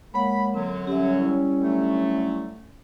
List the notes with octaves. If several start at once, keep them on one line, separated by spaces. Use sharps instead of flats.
G#3 A#3 C#5 F#5 B5
F#2 D3 F#3 C4
G3 C#4 G4 E5
E4
D3 F#3 A3